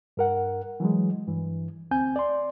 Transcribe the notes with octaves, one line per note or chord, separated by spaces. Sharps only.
G2 A#4 F#5
E3 F#3 G#3
G2 E3
D2 C4 G#5 G6
D5 C6